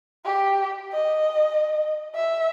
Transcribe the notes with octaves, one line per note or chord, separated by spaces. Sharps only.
G4
D#5
E5